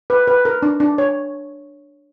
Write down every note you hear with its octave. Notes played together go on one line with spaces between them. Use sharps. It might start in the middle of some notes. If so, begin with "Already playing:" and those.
B4
B4
A#4
D4
D4
C#5